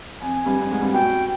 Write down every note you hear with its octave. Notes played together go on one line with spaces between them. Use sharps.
F2 G#5
G2
F2
G#2
G2
B2 G5